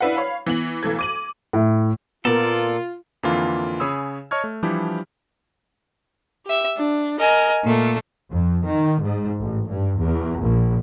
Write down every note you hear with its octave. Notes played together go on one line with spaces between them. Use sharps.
D4 E4 B4 F5 F#5
C#5 F5 B5
E3 B3 F#7
B1 E3 A3 A4 G#6
D6 D#7 F#7
A2
A#2 B3 F4 A4 A#4 D5
F2 D3 E3 A#3 F4
C#3 G#4 C#5 B5 D#6 E6
C#5 D#5 A5 C#6 F6 G#6
A3
E3 F3 G3 D4 E4 G4
G4 E5
D4
A#4 D#5 G#5
A#2 A3
F2
D#3
G#2
A1
G2
E2
A#1